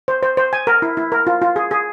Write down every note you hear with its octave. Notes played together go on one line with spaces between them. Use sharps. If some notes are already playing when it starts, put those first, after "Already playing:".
C5
C5
C5
G#5
A#4
E4
E4
A#4
F4
F4
G#4
G#4